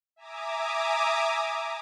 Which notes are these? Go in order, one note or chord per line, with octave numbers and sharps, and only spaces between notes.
E5 G#5 A#5 D6 D#6